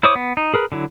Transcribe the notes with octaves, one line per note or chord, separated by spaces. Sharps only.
E4 C5 C#5 D6 D#6
B3
D#4
G#4 A#4 B4
D3 F#3 E4